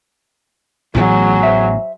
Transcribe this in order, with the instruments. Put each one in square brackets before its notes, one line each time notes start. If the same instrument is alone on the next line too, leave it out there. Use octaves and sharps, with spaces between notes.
[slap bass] A1 A2 B3 [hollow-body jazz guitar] E3 [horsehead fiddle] F#3 G#4
[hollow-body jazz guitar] C5 E5